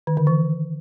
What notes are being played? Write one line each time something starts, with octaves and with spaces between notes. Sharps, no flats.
D#3
D3
E3